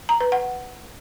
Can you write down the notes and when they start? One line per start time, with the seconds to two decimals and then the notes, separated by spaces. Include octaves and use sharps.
0.09 A#5
0.21 B4
0.32 F#5